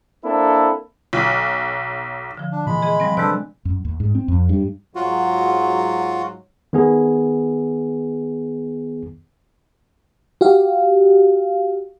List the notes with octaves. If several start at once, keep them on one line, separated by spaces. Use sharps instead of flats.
A#3 C4 D4 E4 A4
B1
D3 F3
D4
A#2 E3 G#3 B5
G#4 D#5
F3 G3 C4
C3 F#3 G#3 D4 A4 B4 C5 D5
F#2
D#2
G#2
C4
F2
G2
G#2 F#3 F4 F#4
D#3 B3 G#4
F#4 G4 F5